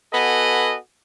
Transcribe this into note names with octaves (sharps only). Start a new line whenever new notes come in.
B3 F#4 A4 B4 D#5 G#5